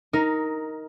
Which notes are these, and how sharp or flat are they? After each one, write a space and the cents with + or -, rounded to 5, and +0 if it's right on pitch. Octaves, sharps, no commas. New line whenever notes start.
D#4 +15 A#4 +0